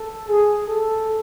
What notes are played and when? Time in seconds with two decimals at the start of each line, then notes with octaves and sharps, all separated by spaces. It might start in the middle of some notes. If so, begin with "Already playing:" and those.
Already playing: A4
0.27 G#4
0.67 A4